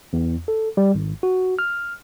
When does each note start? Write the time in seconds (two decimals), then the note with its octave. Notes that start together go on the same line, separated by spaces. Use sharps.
0.13 E2
0.48 A4
0.77 G3
0.95 G#1
1.23 F#4
1.59 F6